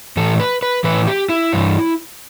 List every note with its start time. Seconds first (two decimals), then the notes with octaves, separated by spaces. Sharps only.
0.17 A2 E3 A4
0.40 B4
0.63 B4
0.84 A2 E3 B4
1.08 G4
1.29 E4
1.52 G2 E3